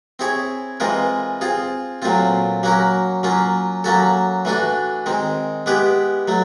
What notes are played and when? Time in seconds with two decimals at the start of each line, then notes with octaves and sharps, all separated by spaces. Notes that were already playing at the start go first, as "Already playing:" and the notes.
0.19 C4 E4 G#4 C#5
0.80 E3 G#3 C4 F4 A#4
1.41 C4 F4 G#4
2.02 A#2 F#3 A3 C4 F4
2.63 F#3 A#3 C#4 F#4 A#4
3.23 F#3 A#3 C#4 F4
3.84 F#3 A#3 C#4 F#4 A4
4.45 E3 A3 D4 F#4
5.06 D#3 G#3 C4
5.66 G#3 B3 E4 G4 B4
6.28 F#3 A3